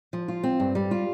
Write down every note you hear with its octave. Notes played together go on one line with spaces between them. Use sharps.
F3
F4
C4
G2
G3
F4